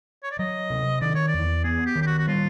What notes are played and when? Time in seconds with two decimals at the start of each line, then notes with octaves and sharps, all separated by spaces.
0.23 C#5
0.31 D5
0.39 F#3 D#5
0.70 C3
1.01 D#3 D5
1.15 C#5
1.28 D5
1.34 E2
1.64 B3 G#4
1.86 G4
1.95 D#3
2.02 G4
2.06 F#4
2.18 F#4
2.27 G3 F4